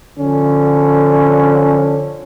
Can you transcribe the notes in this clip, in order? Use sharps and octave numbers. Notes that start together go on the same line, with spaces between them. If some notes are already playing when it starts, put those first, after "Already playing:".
D3 F3 C#4 D4